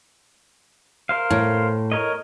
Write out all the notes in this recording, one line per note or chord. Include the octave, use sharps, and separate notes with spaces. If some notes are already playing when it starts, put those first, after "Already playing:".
A#4 C5 F5
A2
A#4 C#5 D#5